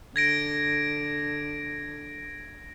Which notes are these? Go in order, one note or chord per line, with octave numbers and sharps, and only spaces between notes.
D3 G#6 A#6 D7